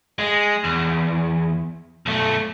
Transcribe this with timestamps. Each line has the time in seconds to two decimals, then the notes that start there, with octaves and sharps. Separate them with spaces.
0.19 G#3
0.64 E2
2.06 B1 A3